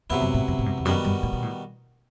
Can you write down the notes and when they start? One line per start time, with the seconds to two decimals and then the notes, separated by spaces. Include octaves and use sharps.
0.10 E2 C3 F#3 B3 E4
0.22 F#2
0.34 A2
0.48 F#2
0.59 A2
0.66 G2
0.78 E2
0.85 F#2 D#3 G3 B3 F#4
1.05 G2
1.23 A2
1.33 B2
1.42 A2